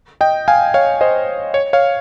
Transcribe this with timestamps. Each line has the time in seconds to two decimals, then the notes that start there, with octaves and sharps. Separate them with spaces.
0.21 D#5 G5
0.48 F5 G#5
0.74 C#5 F5
1.01 C5 D#5
1.54 C#5
1.73 C#5 F5